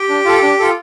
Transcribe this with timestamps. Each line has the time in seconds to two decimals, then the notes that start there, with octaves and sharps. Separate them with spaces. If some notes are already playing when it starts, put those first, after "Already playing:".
Already playing: G4 G5
0.09 D4
0.25 F4 A4
0.42 D4
0.59 F4 A4